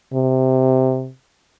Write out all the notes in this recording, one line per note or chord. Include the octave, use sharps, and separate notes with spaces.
C3